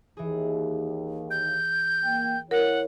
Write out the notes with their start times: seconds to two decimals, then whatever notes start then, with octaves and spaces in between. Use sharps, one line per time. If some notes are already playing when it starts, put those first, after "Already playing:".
0.17 D#2 E3 G#4
1.31 G6
2.04 A#3 G5
2.51 E4 A#4 C#5 F#5